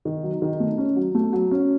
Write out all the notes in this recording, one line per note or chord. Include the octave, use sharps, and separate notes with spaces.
D#3
F#3
D#3
A3
C#4
F#3
A3
F#3
C#4